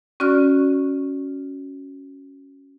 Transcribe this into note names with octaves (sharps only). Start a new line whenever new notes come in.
C#4 F#4 D5 C#6 F6